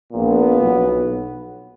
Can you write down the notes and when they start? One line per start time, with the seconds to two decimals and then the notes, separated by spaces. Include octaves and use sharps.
0.11 A#1 A#2 B3
0.60 B1